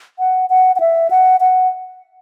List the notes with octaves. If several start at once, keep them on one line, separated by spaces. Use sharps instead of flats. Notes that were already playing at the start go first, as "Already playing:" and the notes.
F#5
F#5
F#5
E5
F#5
F#5